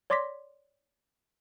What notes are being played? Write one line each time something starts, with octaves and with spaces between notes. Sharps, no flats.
C#5 D5 C6 D6 A#6 B6